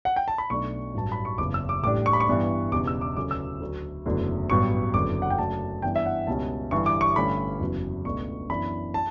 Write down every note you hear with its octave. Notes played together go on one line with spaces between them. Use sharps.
F#5
G5
A5
B5
B1 B2 A3 D4 C#6
A1 G2 F#3 A5
B5
C#6
F#1 E2 C#3 D6
E6
D6
A1 A2 G3 D4 D6
C#6
B5
C#6
G2 E3 B3 D4
E1 E2 C#3 G3 D6
E6
D6
D2 C#3 F#3 C#4 D6
E6
D2 D3 F#3
F#1 E2 D3 F#3 A3
A1 G2 F#3 B3 C#6
F#1 E2 D3 F#3 D6
F#5
G5
F#2 C#3 F#3 A3 D4 A5
G2 E3 B3 D4 G5
E5
F#5
C#2 B2 G3 C#4 A5
G1 G2 E3 C#6
D6
C#6
G1 G2 D3 A3 C#4 B5
F#1 E2 C#3 F#3
C#2 B2 A3 D4 C#6
F#2 E3 B3 D4 B5
A5